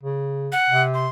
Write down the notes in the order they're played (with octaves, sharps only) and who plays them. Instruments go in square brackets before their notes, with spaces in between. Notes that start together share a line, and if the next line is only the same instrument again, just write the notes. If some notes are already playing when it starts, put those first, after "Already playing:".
[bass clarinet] C#3
[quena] F#5
[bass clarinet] C3
[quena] C6